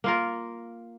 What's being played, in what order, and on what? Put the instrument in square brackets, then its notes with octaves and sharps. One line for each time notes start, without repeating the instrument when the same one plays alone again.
[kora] A#3 F4 A#4